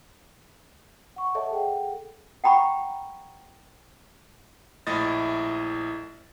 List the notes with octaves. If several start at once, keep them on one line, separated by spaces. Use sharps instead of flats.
F#5 C#6
A4 C#5 D#5 E5 F#5 A5
G#4 A4 F#5 G5
F#5 G5 A#5 B5 C#6
A#1 A2 E4 D#5 A6